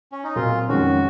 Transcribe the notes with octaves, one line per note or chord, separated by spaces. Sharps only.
C#4
D#4
A#2 F#3 C4 F4
F2 D#3 G#3 C#4 F#4